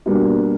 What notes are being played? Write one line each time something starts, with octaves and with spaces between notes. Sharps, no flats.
B2 G3 A#3 D4